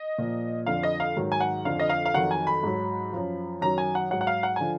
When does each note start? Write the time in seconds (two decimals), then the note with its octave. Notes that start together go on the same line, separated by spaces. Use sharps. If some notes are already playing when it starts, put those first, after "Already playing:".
Already playing: D#5
0.18 A#2 F3
0.66 F2 D3 F3 F5
0.83 D#5
1.00 F5
1.17 G#2 D#3 F#3
1.32 G#5
1.40 F#5
1.65 F2 D3 F3 F5
1.79 D#5
1.89 F5
2.06 F5
2.14 F2 D#3 F#3 F#5
2.31 G#5
2.47 B5
2.63 G#2 F#3
3.13 F#2 F3
3.61 F#2 D#3 F#3 A#5
3.78 G#5
3.95 F#5
4.11 G#2 F#3 F#5
4.21 F#5
4.27 F5
4.43 F#5
4.56 D3 F3 G#5